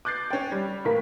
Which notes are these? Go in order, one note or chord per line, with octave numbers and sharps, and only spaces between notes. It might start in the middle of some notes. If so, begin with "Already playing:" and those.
D6 F#6 G6 A6 C7
C#4 G5
G3
A2 E3 A#3 A#4 B6